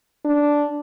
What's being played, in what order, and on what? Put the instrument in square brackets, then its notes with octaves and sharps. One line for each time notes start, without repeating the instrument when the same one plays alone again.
[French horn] D4